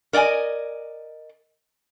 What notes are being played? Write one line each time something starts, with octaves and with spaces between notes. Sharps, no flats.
A#4 D5 D#5 G5 G#5